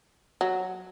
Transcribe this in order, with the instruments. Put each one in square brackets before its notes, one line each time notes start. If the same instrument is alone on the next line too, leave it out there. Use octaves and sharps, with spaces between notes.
[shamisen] F#3